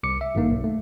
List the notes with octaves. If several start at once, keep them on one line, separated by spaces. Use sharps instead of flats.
C2 D6 C#7
E5
G#1 G2 A#3 D#4
B1
A3